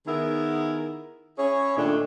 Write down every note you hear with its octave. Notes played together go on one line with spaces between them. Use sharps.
D#3 B3 E4 G#4 A#4
C#4 E4 G#4 C#5
A#2 D#3 A3 D4